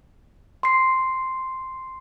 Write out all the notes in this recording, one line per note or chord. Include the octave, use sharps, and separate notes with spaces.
C6 C7